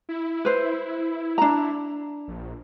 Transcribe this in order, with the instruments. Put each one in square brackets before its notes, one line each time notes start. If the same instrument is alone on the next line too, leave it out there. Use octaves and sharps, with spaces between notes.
[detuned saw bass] E4
[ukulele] B4 C5
D4 A#5
[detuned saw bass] A#1